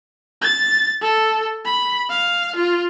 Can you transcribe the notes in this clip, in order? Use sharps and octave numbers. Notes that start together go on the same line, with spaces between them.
A6
A4
B5
F5
F4